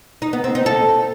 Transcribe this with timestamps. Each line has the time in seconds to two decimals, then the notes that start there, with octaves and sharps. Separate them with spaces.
0.22 D#4
0.33 B3
0.44 C4
0.55 D#4
0.66 A4